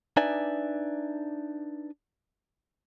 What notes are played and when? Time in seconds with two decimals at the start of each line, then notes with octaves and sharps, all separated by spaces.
0.17 D4 D#4 B4 D5 E5 G#5